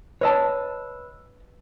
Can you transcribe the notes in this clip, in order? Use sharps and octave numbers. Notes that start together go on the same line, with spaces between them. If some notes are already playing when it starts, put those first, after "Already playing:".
B4 C#5 D#5 A5 E6